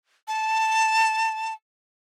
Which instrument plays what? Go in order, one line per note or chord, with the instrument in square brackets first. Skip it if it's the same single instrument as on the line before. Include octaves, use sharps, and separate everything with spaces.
[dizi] A5